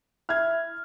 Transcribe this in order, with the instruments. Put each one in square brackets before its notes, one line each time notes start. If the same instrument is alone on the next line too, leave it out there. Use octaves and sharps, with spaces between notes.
[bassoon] E4 [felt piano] F6 G#6